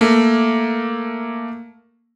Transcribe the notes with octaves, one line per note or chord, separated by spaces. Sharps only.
A3 A#3